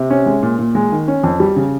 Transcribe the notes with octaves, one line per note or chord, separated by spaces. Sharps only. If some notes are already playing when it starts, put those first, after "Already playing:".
Already playing: C3
C#4
G#3
A#2
A#2
G#3
D#3
C#4
F2
G3
C#3